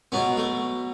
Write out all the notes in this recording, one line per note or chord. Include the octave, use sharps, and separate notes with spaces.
B2 F#3 B3
A3